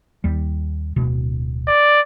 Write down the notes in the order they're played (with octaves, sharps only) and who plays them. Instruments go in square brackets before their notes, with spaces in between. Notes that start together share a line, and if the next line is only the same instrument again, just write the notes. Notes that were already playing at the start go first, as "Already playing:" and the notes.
[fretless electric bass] D#2 G3
D1 B2
[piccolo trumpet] D5